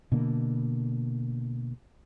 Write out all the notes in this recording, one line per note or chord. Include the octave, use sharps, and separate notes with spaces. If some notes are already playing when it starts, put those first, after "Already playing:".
B2 D3 A#3